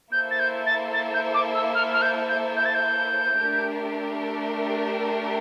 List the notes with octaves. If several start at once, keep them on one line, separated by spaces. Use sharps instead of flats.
A#3 E4 A4 C5 E5 G6
A6
G6
A6
A6
G6
D6
E6
F6
F6
G6
G6
G6
A6
G6
A3 D4 G4 A#4